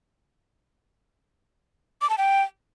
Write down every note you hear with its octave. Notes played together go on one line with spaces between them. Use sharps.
D6
A5
G5